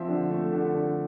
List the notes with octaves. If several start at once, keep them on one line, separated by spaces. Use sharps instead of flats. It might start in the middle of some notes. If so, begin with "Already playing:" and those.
Already playing: F3 C4 E5
D3
A3
D3
D3